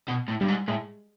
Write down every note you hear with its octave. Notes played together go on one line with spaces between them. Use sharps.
B2
A2
G2 G3
G#2
A2 G#3